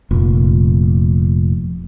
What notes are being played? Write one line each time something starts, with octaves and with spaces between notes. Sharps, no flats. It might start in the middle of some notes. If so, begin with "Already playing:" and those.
F1 A#2